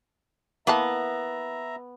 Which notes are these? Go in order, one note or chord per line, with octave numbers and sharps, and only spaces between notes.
E3 A#3 B3 E5 A5 A#5